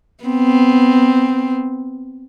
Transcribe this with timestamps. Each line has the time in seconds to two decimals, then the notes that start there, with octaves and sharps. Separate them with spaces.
0.24 B3 C4